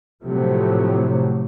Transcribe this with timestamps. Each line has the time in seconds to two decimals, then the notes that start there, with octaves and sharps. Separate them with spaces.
0.24 A2 C3 F3 F#3 A3